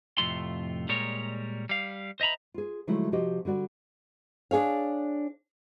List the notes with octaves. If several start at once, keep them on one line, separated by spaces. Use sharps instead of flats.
F2 A2 C3 A3 F4 C6
A#2 G3 G#3 A#4 C#5
G3 F5
C5 D#5 E5 A#5 B5
F4 G#4
D3 F3 F#3 G#3 A3 E4
C3 F3 F#4 G4 D#5
D3 G3 F#4 D5
D4 G#4 C#5 F5